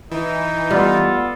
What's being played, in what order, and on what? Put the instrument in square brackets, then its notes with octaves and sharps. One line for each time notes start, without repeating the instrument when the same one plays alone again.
[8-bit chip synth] E3 [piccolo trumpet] D#4
[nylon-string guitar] G3 [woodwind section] B3 F4 A4